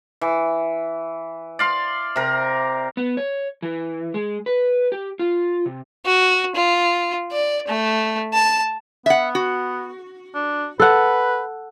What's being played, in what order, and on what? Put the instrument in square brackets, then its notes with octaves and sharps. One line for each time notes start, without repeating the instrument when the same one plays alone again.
[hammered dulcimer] E3
D5 F5 C6
C3 A#4
[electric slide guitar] B3
C#5
E3
G#3
B4
G4
F4
C3
[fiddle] F#4
F4
D5
A3
A5
[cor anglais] B3 [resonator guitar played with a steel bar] E5 F#5
[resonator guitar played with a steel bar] F#4
[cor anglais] D4
[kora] A4 F#5 [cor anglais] B4